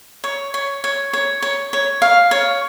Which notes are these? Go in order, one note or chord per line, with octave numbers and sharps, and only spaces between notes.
C#5
C#5
C#5
C#5
C#5
C#5
F5
C#5